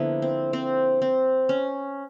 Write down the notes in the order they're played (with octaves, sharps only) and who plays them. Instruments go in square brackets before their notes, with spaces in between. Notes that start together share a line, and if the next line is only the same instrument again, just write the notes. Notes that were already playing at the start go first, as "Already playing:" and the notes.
Already playing: [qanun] D3 F3 A#3 B3 E4
C4
C4
C4
C#4